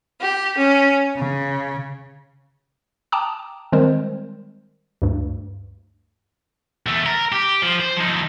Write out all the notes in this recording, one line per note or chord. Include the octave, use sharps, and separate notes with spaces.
G4
C#4
C#3
G5 A5 A#5 D6 D#6
D#3 G3 G#3 C4 A#4 C5
D2 G2
E2 A3
A#4
G4
F3
C5
F3 D#4